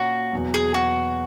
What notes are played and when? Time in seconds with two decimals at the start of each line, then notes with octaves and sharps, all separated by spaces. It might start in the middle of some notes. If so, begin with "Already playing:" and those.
Already playing: A#2 A#3 C#4 F#4
0.32 E2 B2 F#3
0.54 G#4
0.74 F#4